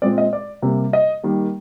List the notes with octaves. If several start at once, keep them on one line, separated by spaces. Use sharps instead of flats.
A#2 G#3 C4 D5
D#5
D5
C3 G3 A#3
D#5
D#3 G3 A#3